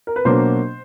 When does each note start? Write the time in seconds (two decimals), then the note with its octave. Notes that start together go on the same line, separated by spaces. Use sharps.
0.07 A#4
0.16 B4
0.25 B2 F#3 A#3 D4 C5